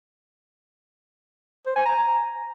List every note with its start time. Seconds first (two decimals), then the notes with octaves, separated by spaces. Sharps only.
1.66 C5
1.76 G#5
1.85 A#5